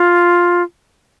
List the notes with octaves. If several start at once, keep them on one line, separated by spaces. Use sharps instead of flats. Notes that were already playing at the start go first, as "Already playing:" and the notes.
Already playing: F4